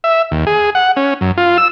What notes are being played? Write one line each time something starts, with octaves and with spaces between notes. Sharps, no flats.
E5
D#2
G#4
F#5
C#4
F#2
F4
E6